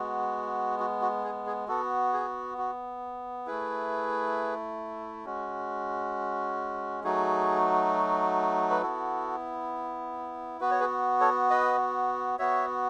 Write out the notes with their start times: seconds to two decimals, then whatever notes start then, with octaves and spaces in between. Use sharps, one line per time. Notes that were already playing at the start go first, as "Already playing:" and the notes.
Already playing: G#3 B3 F#4
0.79 F#4
1.02 F#4
1.24 G#4
1.46 G#4
1.68 B3 F#4 A4
2.13 G#4
2.58 F#4
3.46 A3 E4 G#4 B4
5.25 G#3 C#4 F#4
7.04 F#3 A3 D#4 F#4 G#4
8.70 B4
8.82 B3 E4 F#4 A4
10.61 B3 F#4 B4
10.71 C#5
10.80 G#4 B4
11.20 A4 C#5
11.50 B4 D#5
12.39 B3 F#4 C#5 E5